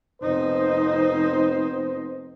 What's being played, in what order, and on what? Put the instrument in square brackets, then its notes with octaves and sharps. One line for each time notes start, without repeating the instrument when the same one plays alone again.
[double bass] F1 D#4 [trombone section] B3 C4 C5